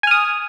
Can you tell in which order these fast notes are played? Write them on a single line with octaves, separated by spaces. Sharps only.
G#5 F6 D#6